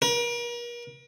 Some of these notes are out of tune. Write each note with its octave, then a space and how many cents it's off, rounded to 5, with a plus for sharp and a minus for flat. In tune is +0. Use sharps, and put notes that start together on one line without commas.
A#4 +40